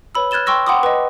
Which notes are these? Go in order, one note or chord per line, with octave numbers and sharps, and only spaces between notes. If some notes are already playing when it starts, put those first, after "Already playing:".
B4 C#5 B5 E6
F6 F#6 G#6 A6 E7 G7
G5 C6 C#6 E6 A#6
F#5 G5 B5 C6 D6 D#6
B4 D#5